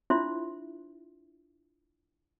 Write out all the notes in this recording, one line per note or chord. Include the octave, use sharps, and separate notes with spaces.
D4 E4 F4 C5 E5 C6